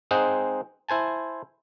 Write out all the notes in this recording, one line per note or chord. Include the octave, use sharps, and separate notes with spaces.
G#3 C4 D#4 G#4 C5 F#5
E4 C5 G#5 A5